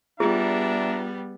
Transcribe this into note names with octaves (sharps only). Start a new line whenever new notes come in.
G3 B3 D4 F4 G#4 E5 A#5